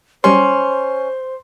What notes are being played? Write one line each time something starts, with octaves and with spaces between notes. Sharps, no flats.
F#3 G3 C#4 G4 C5 C6